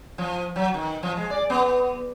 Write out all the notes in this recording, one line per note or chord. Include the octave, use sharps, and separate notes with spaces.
F3
F#3
D#3
F3
G#3
D5
B3